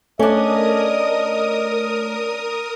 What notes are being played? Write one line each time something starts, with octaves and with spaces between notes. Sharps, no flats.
A3 C#4 D4 A#4 D#5 D#6